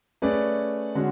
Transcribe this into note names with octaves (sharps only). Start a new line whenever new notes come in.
A3 C#4 G#4 B4 D5
D3 G#3 C#4 F#4